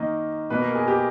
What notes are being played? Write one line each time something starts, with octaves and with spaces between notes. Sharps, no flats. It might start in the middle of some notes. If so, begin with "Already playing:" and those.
Already playing: D#3 A#3 D#5
B2 A#3 B4
A#4
G#4
G4